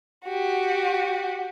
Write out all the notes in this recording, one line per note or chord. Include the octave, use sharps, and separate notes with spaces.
F#4 G4